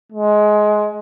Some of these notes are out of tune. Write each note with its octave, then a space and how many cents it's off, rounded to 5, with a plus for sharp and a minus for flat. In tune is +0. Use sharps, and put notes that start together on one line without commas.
G#3 +20